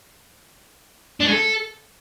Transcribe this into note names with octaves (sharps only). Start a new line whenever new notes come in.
D4
G#3
A4